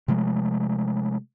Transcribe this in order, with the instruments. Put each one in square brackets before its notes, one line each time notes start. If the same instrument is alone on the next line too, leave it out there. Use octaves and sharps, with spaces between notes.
[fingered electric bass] C3 F3 G#3 A3